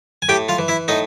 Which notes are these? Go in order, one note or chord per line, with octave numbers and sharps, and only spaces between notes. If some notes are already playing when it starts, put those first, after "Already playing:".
G#5
A2 G4 G5
F4 F5
E3
E4 E5
A2 D#4 D#5